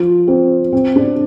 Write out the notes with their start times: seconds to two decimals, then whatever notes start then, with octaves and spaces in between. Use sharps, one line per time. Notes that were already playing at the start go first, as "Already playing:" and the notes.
Already playing: F3
0.27 C4
0.72 C4
0.96 D4